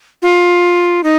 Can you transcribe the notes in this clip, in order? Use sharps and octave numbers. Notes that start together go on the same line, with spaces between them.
F4
D#4